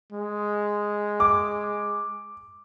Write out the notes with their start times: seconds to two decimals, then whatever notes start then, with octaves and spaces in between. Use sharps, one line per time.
0.13 G#3
1.20 D6